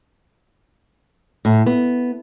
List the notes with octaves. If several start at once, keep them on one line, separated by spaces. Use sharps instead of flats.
A2
B3